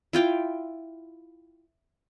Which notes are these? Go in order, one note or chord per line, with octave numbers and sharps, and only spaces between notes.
E4 F4 G5 D6